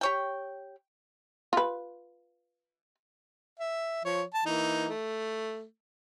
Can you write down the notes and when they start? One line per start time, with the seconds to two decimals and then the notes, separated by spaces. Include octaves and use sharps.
0.01 G4 C#5 G5
1.53 F4 B4
3.60 E5
4.05 F3 C#5
4.34 A5
4.46 E3 A#3 D#4
4.89 A3